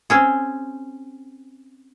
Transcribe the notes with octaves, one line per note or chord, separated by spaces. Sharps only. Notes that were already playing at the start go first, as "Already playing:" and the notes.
C4 C#4 G#4